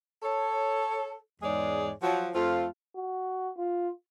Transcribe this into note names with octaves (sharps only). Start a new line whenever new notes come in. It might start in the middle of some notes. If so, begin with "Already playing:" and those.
A4 C#5
E2 G#2 G#3 G#4 C#5 D5
F3 F#3
F2 A3 C4 F4
F#4
F4